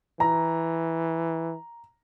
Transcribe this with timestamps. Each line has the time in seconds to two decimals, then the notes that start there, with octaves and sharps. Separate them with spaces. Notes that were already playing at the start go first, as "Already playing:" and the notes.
0.20 E3 A#5